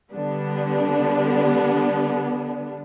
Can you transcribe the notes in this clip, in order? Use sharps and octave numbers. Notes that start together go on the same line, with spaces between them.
D3 G3 B3 D4